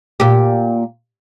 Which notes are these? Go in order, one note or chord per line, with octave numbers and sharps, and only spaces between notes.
A#2 G4